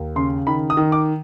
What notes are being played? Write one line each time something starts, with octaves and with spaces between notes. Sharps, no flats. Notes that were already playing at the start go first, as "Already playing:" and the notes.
Already playing: D#2
C#3 C6
D#3 B5
D#6
D#3
D6